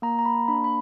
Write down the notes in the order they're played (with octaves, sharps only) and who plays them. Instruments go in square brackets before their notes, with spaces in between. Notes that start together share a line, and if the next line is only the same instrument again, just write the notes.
[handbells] A#3 A#5
A#5
B5
D4 B5
B5